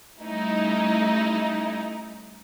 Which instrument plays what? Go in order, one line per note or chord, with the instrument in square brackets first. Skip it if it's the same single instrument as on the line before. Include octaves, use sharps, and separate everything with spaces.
[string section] G3 A3 C#4 D#4 E4